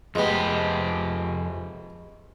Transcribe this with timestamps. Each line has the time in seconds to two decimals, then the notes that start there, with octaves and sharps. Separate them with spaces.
0.15 F2 G#3 B3 G4